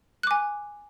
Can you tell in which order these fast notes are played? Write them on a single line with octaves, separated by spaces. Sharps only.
F#6 D6 G#5